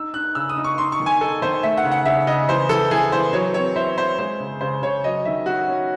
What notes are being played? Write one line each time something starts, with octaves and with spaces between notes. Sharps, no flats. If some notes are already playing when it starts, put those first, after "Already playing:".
Already playing: D#4 E6
D#4 F#6
C#3 E6
D#6
D#4
C#6
D#4 C6
C#6
D#3
G#5
D#4 A4
D#3 C5
A3 E5
F#5
C#3
F#5
C#3 E5
C#3 D#5
E3 C5
E3 A4
E3 G#4
E3 C5
F#3 C#5
C4 C#5
E4 C5
E4 C5
G#3 C5
C#3
C#3 C5
C#3 C#5
F#3 D#5
D#3 E5
C#4 F#4
C#4